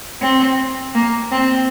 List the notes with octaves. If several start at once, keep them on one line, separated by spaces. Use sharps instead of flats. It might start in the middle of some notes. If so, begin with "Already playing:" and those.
C4
A#3
C4